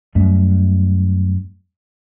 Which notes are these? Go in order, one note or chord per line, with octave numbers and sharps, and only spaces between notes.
F#2 G3 A3